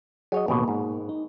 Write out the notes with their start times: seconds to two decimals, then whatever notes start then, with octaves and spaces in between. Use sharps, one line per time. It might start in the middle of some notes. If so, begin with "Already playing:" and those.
0.32 F#3 G#4 C#5 D#5
0.48 A1 D#2 B2 A#3
0.68 G#2
1.09 D#4